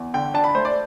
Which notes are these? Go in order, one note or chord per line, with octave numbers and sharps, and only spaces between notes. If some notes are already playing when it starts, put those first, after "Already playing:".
Already playing: E2
D3 G5
D4 A5
B5
A3 C5
D5